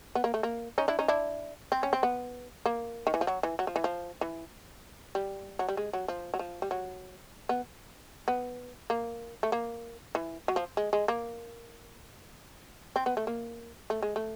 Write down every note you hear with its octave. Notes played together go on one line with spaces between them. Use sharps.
B3
A#3
A3
A#3
C#4 D#4
D4 E4
C#4 D#4
D4 E4
C4
C#4
C4
B3
A#3
D#3
E3
F3
F#3
E3
F#3
F3
E3
F3
E3
G3
F#3
G3
G#3
F#3
F3
F#3
F3
G3
F#3
B3
B3
A#3
A3
A#3
E3
F#3
F3
G#3
G#3
A#3
C4
B3
A3
A#3
A3
G#3
A3